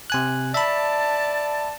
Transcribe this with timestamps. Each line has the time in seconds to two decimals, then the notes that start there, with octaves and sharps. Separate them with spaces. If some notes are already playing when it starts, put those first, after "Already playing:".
0.10 C3 G#5 F#6
0.54 D5 E5 A5 B5